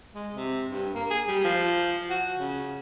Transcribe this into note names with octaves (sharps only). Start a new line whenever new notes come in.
G#3
C3
G2
A#3
G#4
G3
F3
F#4
C#3